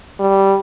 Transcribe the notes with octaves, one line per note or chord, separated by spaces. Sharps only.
G3